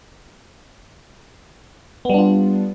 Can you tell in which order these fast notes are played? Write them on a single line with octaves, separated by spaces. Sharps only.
B3 G3 D4 F4